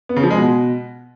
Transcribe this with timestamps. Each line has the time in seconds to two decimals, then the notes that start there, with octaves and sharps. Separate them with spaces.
0.09 B3
0.16 C#3
0.23 F3
0.30 G#3
0.37 B2